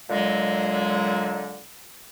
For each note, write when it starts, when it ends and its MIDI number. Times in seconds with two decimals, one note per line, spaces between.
0.10 1.60 46
0.10 1.60 50
0.10 1.60 54
0.10 1.60 56